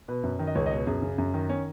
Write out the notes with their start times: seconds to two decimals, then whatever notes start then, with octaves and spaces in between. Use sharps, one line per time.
0.08 B2 B4
0.23 F#2
0.39 D#3
0.47 D#5
0.55 C#2 C#5
0.66 D#5
0.71 B2 C#5
0.86 F#2 G#4
1.02 C#3
1.18 F#2
1.34 D#3
1.49 C#4